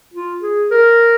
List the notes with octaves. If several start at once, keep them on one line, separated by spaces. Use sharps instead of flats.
F4
G#4
A#4